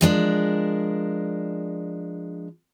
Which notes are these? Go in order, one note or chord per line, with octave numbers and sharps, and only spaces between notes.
F3 G#3 D4 A#4